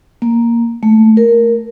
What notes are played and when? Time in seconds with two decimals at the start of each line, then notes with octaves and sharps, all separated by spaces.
0.22 A#3
0.83 A3
1.17 A#4